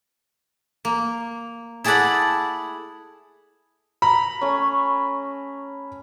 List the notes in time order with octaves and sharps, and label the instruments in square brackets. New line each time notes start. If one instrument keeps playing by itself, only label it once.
[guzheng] A#3
E4 G#4 A4 D5 F#5 B5
[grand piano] A#5 B5
[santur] A3 C#4